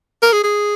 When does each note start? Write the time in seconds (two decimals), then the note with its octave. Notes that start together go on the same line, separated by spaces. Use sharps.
0.22 A#4
0.33 G#4
0.44 G#4